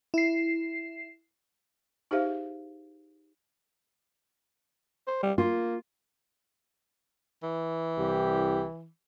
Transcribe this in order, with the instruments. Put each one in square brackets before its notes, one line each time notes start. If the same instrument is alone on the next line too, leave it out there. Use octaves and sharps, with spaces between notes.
[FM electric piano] E4 C7
[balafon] D#4 G4 G#4 C5 E5 F5
[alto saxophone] C5
G3
[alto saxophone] A#3 [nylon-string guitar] F4
[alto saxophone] E3
[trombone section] C2 G4